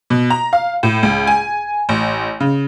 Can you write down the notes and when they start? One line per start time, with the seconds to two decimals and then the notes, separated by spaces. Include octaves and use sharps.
0.10 B2
0.30 A#5
0.53 F5
0.83 A2
1.03 C#2
1.27 G#5
1.89 A1
2.40 C#3